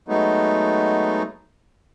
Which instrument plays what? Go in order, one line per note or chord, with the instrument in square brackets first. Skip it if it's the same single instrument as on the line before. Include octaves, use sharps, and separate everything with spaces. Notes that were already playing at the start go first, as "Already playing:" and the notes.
[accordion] F#3 G#3 A3 B3 D#4